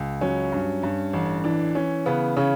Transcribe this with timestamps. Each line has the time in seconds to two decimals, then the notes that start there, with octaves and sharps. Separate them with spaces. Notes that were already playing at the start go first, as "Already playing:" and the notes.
Already playing: C#2
0.21 F#3 C#4
0.52 G2
0.83 G2
1.13 A1
1.44 E3 D4
1.75 E3 C#4
2.06 C#3 B3
2.37 C#3 C#4